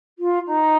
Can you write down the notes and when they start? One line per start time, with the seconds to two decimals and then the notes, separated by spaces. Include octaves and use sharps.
0.18 F4
0.46 D#4